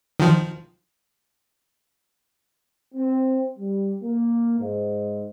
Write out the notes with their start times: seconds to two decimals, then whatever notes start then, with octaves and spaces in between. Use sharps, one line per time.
0.20 D#3 F3
2.95 C4
3.58 G3
4.02 A#3
4.59 G#2